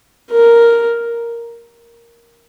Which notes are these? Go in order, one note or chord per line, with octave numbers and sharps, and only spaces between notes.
A#4